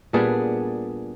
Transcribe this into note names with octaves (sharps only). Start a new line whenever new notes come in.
A#2 G3 B3 D4 G#4